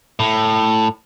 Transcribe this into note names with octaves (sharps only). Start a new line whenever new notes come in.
A2